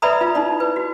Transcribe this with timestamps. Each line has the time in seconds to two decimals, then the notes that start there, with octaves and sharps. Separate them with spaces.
0.02 B4 D5 E5 A#5 B5 D#6
0.21 F4
0.35 D#4 E4 D5
0.60 B4
0.76 F#4